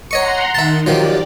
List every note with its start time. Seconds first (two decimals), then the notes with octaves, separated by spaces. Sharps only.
0.11 C#5 D#5 F#5 A#5 C6 C#6
0.55 D#3 E5 A5
0.87 D#3 F3 F#3 G4 D5